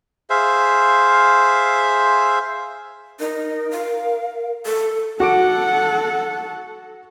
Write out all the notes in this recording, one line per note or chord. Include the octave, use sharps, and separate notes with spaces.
G#4 C5 E5 F5
D#4 A#4
F5
A4
F#4 A4 F#5 D6 D7